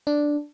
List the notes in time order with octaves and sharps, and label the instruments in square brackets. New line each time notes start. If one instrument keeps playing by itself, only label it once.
[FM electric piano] D4